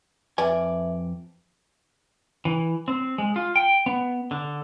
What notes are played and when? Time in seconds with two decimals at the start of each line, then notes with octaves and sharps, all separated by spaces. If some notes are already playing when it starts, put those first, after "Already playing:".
0.38 F2 B4 D5 E5 G#5
2.45 E3
2.88 C4
3.18 G#3
3.36 F4
3.56 G5
3.86 B3
4.31 D3